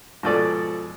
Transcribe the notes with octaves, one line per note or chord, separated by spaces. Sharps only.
G#2 B2 F3 A4 D5